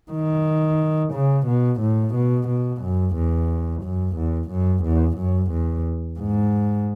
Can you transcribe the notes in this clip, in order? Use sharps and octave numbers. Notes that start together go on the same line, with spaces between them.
D#3
C#3
B2
A2
B2
B2
F#2
E2
F#2
E2
F#2
E2
F#2
E2
G#2